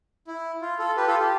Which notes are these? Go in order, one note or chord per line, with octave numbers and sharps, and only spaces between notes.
E4
F4
F4 A4
G4 B4
F4 A4
G4